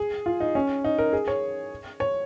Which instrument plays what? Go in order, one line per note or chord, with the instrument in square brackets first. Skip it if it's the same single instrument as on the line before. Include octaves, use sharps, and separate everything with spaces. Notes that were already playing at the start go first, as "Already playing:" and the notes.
Already playing: [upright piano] G#4
F4
D#4
C#4
D#4
A#4
G#4
C#5
C#5